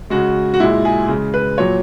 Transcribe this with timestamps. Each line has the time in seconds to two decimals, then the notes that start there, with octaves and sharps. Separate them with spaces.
0.10 C#3 G#3 F#4
0.54 F#4
0.60 A#2 G#3 E4
0.85 G#4
1.08 C#3 G#3
1.34 B4
1.58 A#2 F#3 C#5